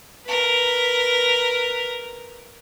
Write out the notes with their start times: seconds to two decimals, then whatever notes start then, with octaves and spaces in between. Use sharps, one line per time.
0.25 A#4 B4